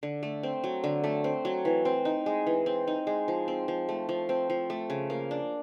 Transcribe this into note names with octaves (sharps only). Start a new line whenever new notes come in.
D3
A3
C4
F#3
D3
A3
C4
F#3
E3
C4
D#4
G#3
E3
C4
D#4
G#3
F3
C4
F3
A3
F3
C4
F3
A3
C#3
A#3
D4